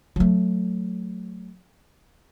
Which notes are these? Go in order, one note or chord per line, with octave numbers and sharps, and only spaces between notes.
F#3 A3